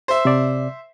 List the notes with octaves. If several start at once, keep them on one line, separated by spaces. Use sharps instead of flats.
C5 E5
C3 D5